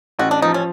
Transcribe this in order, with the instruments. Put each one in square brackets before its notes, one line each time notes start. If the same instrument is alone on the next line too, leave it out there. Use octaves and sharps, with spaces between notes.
[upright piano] A1 [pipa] F#4
[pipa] D4
[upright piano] F3 [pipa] D#4
[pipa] C#4